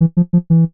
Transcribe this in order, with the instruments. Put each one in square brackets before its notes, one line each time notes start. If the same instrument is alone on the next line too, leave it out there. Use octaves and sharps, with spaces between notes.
[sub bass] E3
F3
F3
E3